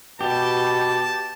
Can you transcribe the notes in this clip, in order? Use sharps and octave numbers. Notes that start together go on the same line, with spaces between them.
B2 G4 A5